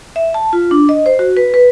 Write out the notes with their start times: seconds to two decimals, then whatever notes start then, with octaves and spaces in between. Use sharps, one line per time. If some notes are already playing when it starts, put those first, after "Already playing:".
0.16 E5
0.34 A5
0.53 F4
0.71 D4
0.89 D#5
1.06 C5
1.19 F#4
1.37 B4
1.54 B4